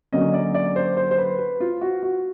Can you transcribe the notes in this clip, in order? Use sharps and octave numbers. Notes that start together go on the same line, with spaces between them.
D3 F#3 A#3 C#4 D#5
D5
D5
C5
C5
C5
B4
B4
F4
F#4
F#4